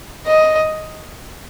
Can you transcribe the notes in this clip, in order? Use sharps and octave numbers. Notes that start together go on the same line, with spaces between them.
D#5